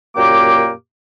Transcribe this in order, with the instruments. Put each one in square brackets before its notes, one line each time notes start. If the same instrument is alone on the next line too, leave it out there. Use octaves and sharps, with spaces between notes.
[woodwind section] F#2 A#2 A#3 G4 D6